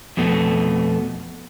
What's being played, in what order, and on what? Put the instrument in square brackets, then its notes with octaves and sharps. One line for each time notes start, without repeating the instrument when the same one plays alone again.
[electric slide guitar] F2 B2 A3 B3